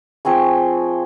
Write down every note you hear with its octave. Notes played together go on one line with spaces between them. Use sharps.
F3 C4 G#4 C#6